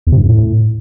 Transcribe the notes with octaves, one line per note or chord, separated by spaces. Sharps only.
E2
C3
G2
F2
A2